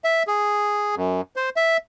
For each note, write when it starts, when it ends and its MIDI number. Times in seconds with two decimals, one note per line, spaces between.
0.04 0.23 76
0.27 0.95 68
0.96 1.21 42
1.36 1.49 72
1.57 1.77 76